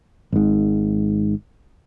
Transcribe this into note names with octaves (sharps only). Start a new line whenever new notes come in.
G#1 G#2